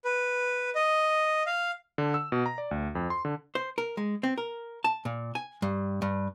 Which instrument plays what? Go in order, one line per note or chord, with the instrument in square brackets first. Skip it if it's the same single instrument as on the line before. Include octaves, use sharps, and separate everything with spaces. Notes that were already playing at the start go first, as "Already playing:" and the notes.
[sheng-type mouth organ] B4
D#5
F5
[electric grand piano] D3
E6
B2
A#5
D5
D2
F2
C6
D3
[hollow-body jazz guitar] C5
A#4
G#3
C4
A#4
A5
A#2
G#5
G2
G2